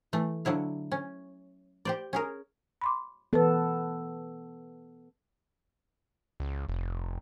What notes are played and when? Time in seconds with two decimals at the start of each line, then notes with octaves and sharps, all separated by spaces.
0.13 E3 A3
0.45 D3 F#3 E4 F5
0.92 C#4
1.85 G4 C5 D5
2.13 C#4 G#4 A#4
2.82 B5 C6 D6
3.33 E3 B3 A4 B4
6.40 C#2
6.69 F1